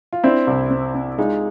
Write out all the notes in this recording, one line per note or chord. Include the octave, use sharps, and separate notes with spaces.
F4
C4 D4 E4
C2
C4
C4
G#3 D#4 F4